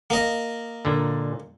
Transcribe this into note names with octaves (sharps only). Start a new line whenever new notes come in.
A#3 D#5
A#2 D3